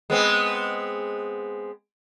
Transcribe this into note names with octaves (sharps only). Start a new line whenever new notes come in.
G#3 B3 C4